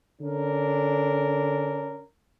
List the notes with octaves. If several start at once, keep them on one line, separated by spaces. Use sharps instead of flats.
D3 C#4 D4 A#4